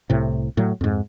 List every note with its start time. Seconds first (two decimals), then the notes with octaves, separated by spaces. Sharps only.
0.10 C2 A2 C3
0.57 A2 F#3
0.81 F2 G#2